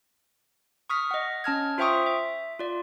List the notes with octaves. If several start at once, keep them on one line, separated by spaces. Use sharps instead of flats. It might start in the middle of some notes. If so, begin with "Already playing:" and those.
C#6 D#6 F6 B6
D#5 F#5
C#4 A5 F6 G#6
F4 C5 E5 G5 C#6 D#6
E5
F4 D5